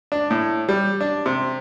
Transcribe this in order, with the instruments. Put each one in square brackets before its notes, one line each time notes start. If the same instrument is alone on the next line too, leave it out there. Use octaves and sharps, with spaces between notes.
[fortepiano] D4
A2
G3
D4
C3